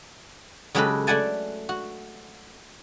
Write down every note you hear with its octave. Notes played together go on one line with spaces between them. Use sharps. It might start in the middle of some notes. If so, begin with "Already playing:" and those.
C#3 F#3 G#3 G4 A4 B4
A3 D5 F#5 G#5 A5
F#4